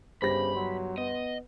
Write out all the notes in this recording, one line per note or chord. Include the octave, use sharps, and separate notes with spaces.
G1 C#3 G4 C5 B5 A#6
F#3 C6
B3 D#5